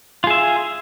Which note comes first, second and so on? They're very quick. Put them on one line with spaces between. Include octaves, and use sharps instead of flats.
F4 G#4 E5